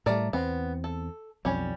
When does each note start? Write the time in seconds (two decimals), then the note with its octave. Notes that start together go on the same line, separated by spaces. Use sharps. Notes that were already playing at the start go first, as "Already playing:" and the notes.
0.06 A2 G3 A3 A#4 D5
0.33 E2 B3 C4
0.84 A4
1.45 B1 F2 G3 C#4